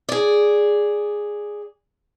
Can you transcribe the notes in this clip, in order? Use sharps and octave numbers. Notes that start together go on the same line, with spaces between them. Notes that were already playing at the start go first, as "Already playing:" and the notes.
G#4 D5